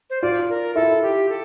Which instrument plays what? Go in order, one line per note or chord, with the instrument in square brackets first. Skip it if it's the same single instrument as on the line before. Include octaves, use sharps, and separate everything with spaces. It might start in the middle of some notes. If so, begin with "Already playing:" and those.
[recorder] C5
[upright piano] F4 [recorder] D5
[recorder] A#4
[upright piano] E4 [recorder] A4
[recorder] G4
A4